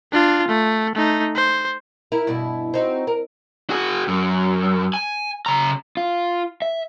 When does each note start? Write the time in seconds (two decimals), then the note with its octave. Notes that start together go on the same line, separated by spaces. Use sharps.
0.13 D4 F4
0.48 A3
0.95 A3 D#4
1.36 C5
2.12 E4 A#4
2.27 G2 B2 E4
2.74 C4 D#4 F#4
3.07 A#4
3.70 F#4 G#4
4.08 F#2
4.94 G#5
5.46 C#3 A#5
5.97 F4
6.62 E5